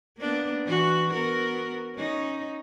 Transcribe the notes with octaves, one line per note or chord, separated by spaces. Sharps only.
A#3 B3 D4
E3 F#4
B3 F#4 A#4
C#4 D#4